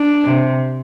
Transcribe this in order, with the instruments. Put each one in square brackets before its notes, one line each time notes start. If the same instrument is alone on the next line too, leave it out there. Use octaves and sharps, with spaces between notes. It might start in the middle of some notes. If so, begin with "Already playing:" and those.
Already playing: [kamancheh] D4
[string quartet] C3